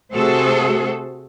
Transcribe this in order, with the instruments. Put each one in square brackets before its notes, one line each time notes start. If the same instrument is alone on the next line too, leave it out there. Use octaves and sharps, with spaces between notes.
[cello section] C3 A3 F#4 G#4 A4 C5